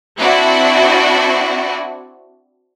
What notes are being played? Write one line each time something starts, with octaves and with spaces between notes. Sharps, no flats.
C4 D4 E4 F#4